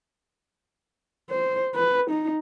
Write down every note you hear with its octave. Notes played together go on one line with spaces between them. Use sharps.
C5
B4
D#4